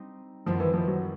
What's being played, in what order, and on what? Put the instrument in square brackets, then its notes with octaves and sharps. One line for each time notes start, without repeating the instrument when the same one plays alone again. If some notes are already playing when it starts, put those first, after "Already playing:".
Already playing: [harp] G3 C4 D#4
[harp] F#2 D#3 G3 C4 E4 [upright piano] F3
[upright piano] E3
F3
F#3